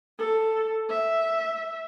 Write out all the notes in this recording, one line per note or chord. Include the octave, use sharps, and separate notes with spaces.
A4
E5